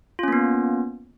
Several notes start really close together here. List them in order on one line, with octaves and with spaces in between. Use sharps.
F4 C#4 A#3 B3